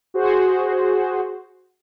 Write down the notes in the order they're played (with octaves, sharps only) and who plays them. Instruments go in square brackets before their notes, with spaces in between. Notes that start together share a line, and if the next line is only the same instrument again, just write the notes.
[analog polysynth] F#4 G#4 C5